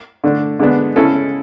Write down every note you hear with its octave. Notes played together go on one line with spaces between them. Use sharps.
D3 A3 D4
D3 G#3 B3 D4
C#3 G#3 C#4 E4 A4